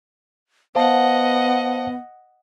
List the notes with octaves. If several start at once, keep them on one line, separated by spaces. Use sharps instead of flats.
B3 C5 D#5 F5 F#5 A5